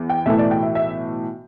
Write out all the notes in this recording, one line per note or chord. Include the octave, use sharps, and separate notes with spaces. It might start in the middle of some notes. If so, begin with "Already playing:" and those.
Already playing: E2
G5
B1 A2 E3 A3 E5
D5
G5
E5
E5